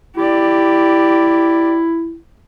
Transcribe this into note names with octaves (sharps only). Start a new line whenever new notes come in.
E4 G4 D5